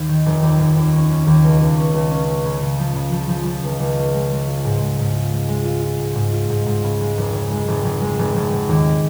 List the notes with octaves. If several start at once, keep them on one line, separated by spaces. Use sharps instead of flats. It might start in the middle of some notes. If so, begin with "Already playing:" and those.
Already playing: D#2
D#3
F1
D#2
F1
D#2
C#4
C#4
D#2
C#2
C#2
C#4
C#2
C#4
C#4
C#3
C#3
F3
C#3
F3
F3
F3
C#2
C#2
C#4
G#3
G#3
F4
G#2
G#2
G#2
F4
G#3
G#3
F4
F4
G#2
G#2
F4
G#2
G#2
C#3
G#3
F1
C#3
G#3
F1
F1
G#3
F1
F1
F1
D#2